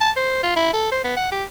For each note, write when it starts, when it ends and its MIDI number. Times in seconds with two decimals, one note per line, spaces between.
0.01 0.11 81
0.16 0.40 72
0.43 0.53 65
0.56 0.69 64
0.73 0.90 69
0.92 1.01 72
1.04 1.13 59
1.16 1.28 78
1.32 1.44 67